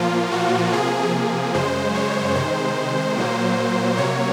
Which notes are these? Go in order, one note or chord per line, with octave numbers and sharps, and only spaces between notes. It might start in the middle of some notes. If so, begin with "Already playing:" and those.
Already playing: A#2 F3 A#3 F4
F#4
C3 F3 A#3 G#4
G#4
F#2 C#3 G#3 C5
C#5
C3 D#3 G#3 C5
A#2 F#3 A#3
C3 F#3 A#3 C#5